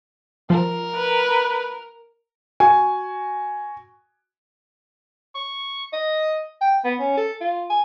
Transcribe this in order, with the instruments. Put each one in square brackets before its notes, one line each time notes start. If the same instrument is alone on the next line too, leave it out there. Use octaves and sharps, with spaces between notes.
[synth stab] F3 [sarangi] A#4
[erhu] B4
[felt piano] F#4 G#5
[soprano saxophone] C#6
D#5
G5
B3
C#4
A4
F4
G#5